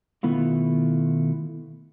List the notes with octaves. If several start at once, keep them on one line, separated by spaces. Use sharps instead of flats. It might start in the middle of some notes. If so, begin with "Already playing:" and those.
B2 D#3 A3 B3 E4 F4